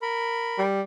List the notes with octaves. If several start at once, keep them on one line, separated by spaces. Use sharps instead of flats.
A#4 B5
G3